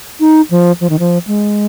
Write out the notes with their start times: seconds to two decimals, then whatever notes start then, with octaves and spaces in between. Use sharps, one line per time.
0.20 D#4
0.51 F3
0.81 F3
0.90 D#3
0.99 F3
1.27 G#3